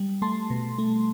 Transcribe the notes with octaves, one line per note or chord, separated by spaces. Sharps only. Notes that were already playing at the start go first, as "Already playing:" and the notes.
Already playing: G3
A3 A5 C6
B2
A3